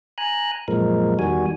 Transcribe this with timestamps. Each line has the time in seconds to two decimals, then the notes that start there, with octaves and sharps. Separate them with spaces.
0.18 G#5 A#5 F#6
0.68 F#2 A#2 F3 G#3 A#4
1.19 E2 D#3 G3 F#4 G#5